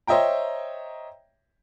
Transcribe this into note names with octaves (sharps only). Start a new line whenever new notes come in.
C5 C#5 D#5 E5 G5 A#5